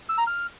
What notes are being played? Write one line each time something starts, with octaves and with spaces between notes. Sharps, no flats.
E6
A#5
F6